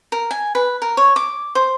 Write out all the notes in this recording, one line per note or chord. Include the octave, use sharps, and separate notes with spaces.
A#4
G#5
B4
A#4
C#5
D6
C5